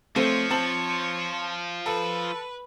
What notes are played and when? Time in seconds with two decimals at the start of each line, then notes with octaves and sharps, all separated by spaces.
0.16 F3 A3 C4 C#5 D#7
0.50 C4 A5 F#7
1.86 A4 B4